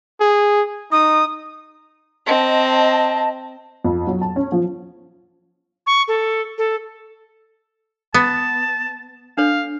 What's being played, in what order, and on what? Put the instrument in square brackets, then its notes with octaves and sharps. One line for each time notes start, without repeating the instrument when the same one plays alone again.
[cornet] G#4
[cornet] D#4 [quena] D#6
[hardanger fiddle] C4 [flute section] D#5 A5
[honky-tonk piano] F2
F#3
A5
C#4
F3
[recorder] C#6
A4
A4
[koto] B3 [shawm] A5
[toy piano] D4 A4 C#5 [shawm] F5